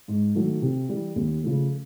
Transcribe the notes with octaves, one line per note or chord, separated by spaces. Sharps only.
G#2
D#3 F#3 A3
C3
E3 G3
D#2
C#3 F3 A3